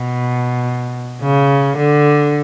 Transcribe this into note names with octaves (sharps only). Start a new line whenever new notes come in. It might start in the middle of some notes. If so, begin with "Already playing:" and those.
Already playing: B2
C#3
D3